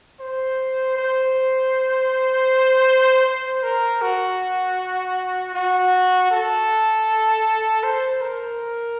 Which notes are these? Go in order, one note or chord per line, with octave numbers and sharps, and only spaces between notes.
C5
C5
C5
A#4
F#4
F#4
A4
C5
A#4